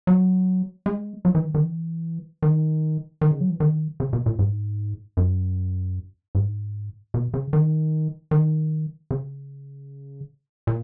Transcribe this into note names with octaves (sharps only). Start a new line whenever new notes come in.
F#3
G#3
F#3
E3
D#3
D#3
E3
D#3
D#3
C#3
F#3
E3
D#3
C#3
B2
A#2
G#2
F#2
G#2
B2
C#3
D#3
D#3
C#3
A#2